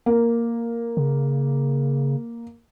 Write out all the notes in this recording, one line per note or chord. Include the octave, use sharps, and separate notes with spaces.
A#3
C#3